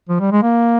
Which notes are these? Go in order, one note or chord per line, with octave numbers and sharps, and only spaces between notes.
F3
G3
G#3
A#3